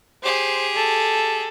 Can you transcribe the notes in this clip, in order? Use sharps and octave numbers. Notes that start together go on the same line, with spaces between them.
G4 G#4 C5
A4